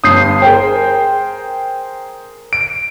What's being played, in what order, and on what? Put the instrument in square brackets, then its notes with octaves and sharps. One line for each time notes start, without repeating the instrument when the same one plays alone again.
[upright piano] G1 G2 [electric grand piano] D#6 G6 C7
[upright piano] G#4 A#4 C5 [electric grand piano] G5
[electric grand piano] D7